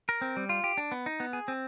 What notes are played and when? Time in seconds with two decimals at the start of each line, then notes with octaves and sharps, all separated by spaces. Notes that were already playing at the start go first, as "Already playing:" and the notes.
0.09 A#4
0.21 C4
0.37 G3
0.49 F4
0.64 G4
0.77 D4
0.92 B3
1.06 D#4
1.20 B3
1.33 G#4
1.48 C4